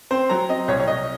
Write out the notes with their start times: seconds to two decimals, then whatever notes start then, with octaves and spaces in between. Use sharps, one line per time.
0.11 C4 C5
0.29 F#3 A#5
0.49 C4 D#5
0.68 C2 C#5
0.80 C#5
0.88 C2 D#5